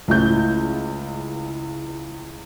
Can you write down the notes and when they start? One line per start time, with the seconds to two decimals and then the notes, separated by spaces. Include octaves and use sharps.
0.08 C#2 A2 G6